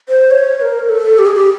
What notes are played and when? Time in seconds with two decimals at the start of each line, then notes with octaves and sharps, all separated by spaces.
0.09 C5
0.31 C#5
0.61 A#4
0.89 A4
1.19 G4
1.26 G#4
1.35 G4